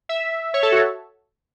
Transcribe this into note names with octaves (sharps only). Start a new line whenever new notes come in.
E5
C#5
A4
F#4